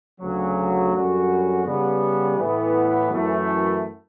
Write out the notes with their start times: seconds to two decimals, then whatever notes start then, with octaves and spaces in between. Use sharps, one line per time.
0.21 D2 C#3 F#3
0.93 F#2 D3 G3 C#4 F#4
1.65 C#3 G3 B3
2.38 A2 E3 B3
3.10 F#2 E3 A3 E4